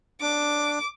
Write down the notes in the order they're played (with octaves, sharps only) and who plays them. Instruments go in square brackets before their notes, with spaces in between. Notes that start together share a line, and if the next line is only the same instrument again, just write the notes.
[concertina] D4 [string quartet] D6